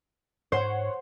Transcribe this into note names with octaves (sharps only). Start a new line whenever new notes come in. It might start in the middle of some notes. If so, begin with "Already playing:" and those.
G#2 C5 C#5 F#5 C6